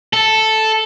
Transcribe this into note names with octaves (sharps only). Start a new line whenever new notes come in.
A4